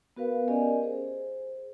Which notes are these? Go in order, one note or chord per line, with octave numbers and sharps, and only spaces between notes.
B3 F#4 A#4 B4 F5
C#4 G4 A#4 D5 D#5 G#5
G#4 C5